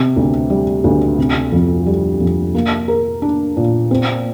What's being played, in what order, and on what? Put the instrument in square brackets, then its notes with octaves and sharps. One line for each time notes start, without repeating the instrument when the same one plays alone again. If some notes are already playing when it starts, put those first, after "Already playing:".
Already playing: [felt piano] C3
D2
G3
D2
C3
F2
G3
F2
A#3
A#4
D4
A#2
C4